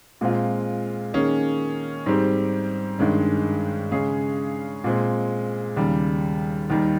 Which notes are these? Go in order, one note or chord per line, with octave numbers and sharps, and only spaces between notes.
A#2 G#3 C4 F4
D#3 A#3 C#4 G#4
G#2 G3 C4 G4
G2 D#3 G#3 C#4
C#3 G#3 C#4 G#4
A#2 G#3 C4
D#2 C#3 G3
D#2 D#3 G3